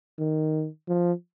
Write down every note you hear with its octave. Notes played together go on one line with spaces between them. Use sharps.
D#3
F3